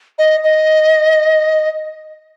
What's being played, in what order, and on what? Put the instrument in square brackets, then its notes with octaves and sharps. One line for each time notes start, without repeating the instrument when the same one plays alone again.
[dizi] D#5
D#5